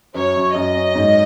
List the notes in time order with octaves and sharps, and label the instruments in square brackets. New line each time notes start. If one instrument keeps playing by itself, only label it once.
[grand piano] F#2 [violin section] C#5
[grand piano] F#2
[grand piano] F#2 [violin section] D#5
[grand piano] C#4
G#2